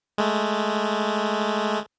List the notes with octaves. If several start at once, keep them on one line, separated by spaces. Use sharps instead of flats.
G#3 A3